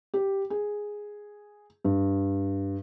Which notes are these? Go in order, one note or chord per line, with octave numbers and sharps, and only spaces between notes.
G4
G#4
G2